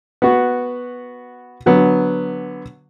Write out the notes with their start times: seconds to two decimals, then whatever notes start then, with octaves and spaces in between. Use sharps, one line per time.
0.22 B3 F#4
1.66 D3 F#3 B3